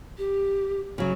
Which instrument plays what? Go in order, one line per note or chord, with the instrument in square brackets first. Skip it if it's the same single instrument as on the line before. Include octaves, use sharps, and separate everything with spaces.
[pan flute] G4
[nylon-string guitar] C#3 F#3